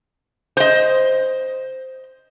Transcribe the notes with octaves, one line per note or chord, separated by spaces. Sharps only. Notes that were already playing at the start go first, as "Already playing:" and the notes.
C5 D#5